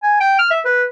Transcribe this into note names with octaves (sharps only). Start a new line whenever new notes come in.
G#5
G5
F6
E5
B4